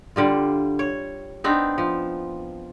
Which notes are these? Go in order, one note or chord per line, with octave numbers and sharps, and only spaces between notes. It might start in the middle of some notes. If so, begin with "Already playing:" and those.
D3 G3 F4
C#5
B3 C4 D4 D#4
F3